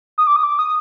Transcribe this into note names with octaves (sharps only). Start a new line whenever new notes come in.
D#6
D6
D#6
D6
D#6